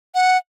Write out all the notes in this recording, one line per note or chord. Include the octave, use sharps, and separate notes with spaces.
F#5